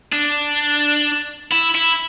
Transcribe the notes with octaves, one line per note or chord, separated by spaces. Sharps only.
D4
E4
E4